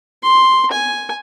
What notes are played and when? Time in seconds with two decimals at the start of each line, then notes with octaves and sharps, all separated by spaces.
0.23 C6
0.71 G#5